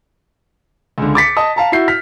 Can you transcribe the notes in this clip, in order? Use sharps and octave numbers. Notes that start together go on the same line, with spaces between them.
C#2 D3
D6 A6 B6 C#7
D#5 A5 D#6
F5 A5 A#5
E4 F#4 G6 C7
F6 B6